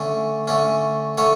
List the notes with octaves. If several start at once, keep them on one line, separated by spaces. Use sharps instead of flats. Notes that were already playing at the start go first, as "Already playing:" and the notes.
Already playing: D3 A3 C#4
D3 A3 C#4
D3 A3 C#4 C#5